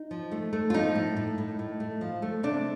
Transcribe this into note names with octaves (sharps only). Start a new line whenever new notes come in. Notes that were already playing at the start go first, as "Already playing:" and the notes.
Already playing: D#4
F3
A3
A3
F4
F3 D#4
A2
A2
A2
A2
A3
F3
A3
C3 D4